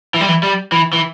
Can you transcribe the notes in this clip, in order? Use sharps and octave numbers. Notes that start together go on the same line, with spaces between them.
E3
G3
E3
G3
E3
E3